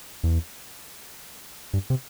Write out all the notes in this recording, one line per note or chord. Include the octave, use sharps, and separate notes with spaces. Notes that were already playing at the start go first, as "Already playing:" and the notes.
E2
G2
C3